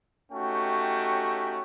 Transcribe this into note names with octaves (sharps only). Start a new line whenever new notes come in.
A3 C#4 D#4 F#4 G4 G5